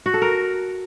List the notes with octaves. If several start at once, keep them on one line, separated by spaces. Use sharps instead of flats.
F#4
A4
A#4